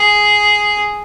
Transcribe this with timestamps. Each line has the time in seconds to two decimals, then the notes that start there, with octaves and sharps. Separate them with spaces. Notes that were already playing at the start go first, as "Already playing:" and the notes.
Already playing: G#4